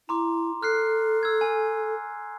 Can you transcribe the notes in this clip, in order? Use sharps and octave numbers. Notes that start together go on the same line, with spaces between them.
E4 A#5 C6 D6
A4 F6 F#6 C7
E6 G#6
G#5